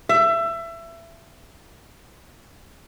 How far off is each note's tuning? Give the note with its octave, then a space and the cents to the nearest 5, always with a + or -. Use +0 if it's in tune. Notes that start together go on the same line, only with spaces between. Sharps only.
E5 +25